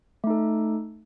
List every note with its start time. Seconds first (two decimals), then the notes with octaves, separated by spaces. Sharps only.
0.24 A3
0.27 D#4
0.30 A4